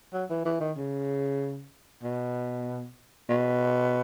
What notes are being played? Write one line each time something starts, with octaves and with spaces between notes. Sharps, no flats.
F#3
E3
E3
D#3
C#3
B2
B2